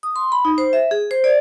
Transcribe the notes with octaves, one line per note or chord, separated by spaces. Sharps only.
D#6
C6
B5
D#4
C5
E5
G#4
C5
D5